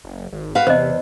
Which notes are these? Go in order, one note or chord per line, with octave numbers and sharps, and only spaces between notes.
F#1
G#1
F#4 B4 F5
E2 C3 C5 D#5